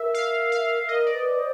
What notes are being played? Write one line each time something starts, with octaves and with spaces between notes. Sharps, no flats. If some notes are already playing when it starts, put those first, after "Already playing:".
Already playing: A#4 E5
F5
F5
A#4 D#5
D5
B4
C5